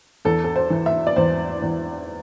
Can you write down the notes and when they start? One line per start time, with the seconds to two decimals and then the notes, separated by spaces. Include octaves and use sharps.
0.25 E2 A4
0.44 A4
0.56 C5
0.70 E3
0.86 E5
1.07 D5
1.16 E2 C5
1.62 E2